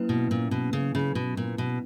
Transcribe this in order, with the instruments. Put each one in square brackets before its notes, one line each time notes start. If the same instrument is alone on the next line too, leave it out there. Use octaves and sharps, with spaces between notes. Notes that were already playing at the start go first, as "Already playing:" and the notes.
Already playing: [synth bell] F#3 A#3 C#4 E4 B4
[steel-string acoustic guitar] B2
A#2
B2
C#3
C#3
B2
A#2
B2